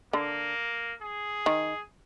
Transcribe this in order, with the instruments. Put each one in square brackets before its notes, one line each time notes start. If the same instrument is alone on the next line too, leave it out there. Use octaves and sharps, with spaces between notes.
[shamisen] D3 [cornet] A#3
[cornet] G#4
[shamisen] D#3